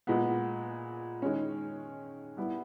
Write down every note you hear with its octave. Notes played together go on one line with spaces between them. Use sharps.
A#2 G#3 B3
D#3 G#3 C#4
G3 B3 E4